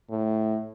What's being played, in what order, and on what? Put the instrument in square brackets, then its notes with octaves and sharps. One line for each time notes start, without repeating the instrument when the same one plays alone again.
[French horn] A2